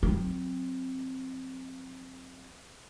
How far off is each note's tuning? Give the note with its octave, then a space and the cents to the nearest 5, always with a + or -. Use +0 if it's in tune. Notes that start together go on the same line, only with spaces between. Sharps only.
F#3 -30 C4 +0